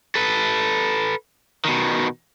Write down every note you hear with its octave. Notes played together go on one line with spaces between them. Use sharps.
A4 B4
B2 D#3